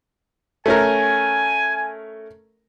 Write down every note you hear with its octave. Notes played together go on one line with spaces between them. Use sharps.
A3 C#4 A#4 G#5